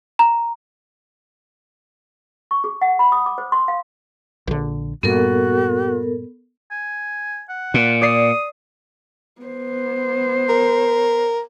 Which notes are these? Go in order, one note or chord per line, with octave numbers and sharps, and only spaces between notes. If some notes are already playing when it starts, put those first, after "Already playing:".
A#5
C#6
G#4
F#5
B5
D#6
D6
C5
C6
F5
A#1 D3
G2 A#2 B3 F#4 A4 A#4
G#5
F#5
A#2
D5 D#6 C7
B3 C5
A#4